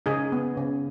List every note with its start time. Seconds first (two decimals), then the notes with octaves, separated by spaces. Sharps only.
0.06 C#3 D#4 G#4
0.32 B3
0.57 C#3